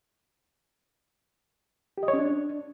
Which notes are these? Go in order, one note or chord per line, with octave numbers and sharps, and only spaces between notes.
G4
D#5
C#5
C#4
D4